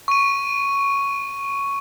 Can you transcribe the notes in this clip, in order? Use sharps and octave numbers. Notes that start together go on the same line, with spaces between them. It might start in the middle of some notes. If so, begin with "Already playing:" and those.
C#6 D#7